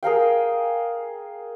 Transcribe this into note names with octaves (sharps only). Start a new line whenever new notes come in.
G#4 A#4 F5 G5